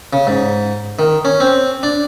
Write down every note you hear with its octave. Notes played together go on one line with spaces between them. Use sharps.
C#3
G#2
D#3
C#4
C4
D4